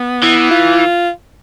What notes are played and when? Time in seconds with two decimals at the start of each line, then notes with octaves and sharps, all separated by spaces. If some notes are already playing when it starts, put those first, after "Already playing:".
Already playing: B3
0.23 E3
0.51 F4